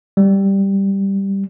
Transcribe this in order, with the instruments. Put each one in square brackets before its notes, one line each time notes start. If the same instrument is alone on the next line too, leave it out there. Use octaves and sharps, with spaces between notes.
[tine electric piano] G3